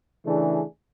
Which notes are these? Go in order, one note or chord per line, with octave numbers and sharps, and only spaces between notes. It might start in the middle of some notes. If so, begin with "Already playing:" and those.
C#3 E3 A3 D4 G#4